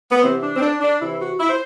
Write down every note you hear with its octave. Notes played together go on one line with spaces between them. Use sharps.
B3
C3 E3 C4
D4
C4
D4
D4
C3 E3 E4
F#4
E4
C5